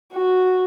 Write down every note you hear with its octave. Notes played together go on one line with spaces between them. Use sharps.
F#4